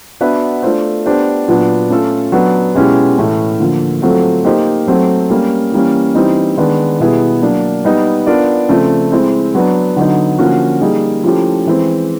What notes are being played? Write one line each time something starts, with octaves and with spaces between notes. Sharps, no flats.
B3 D4 F#4 B4 E5
A3 D4 F4 A4 C5
B3 D4 G4 C5
A#2 F#3 B3 D4
A3 C#4 F4 A4
F#3 B3 D4
B2 G#3 C#4 E4 G4
A2 E3 A3 C#4
D3 F3 A#3
F#3 A3 C4 F4 A4
A#3 D#4 G4 C5
F#3 A3 C4
G3 A#3 C#4
E3 G3 A#3 C#4
E3 G3 C4 D#4
D#3 G#3 B3 D4
B2 G3 B3 E4 G#4
F#3 A#3 D4
G3 B3 D#4
B3 D4 F4 A#4 D5
C#3 F3 A3 C4
G#3 C4 E4
F#3 B3 D4
D3 F#3 B3 D#4
D3 F3 A#3 C#4 F#4
G3 A#3 D#4 G#4
F3 A3 C#4 E4 G4
E3 G#3 C4